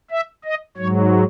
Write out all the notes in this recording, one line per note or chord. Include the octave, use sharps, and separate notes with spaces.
E5
D#5
G#2 F#3 C#5